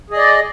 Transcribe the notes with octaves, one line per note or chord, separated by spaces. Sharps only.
G#4 D5 D#5